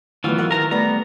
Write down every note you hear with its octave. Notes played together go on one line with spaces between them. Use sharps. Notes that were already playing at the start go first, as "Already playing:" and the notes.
D2 D#3 E3 F#3 B3 F4
G#2 A#4 F#5
D#3 E3 A#4 A#5
G3 A3 B3 A#5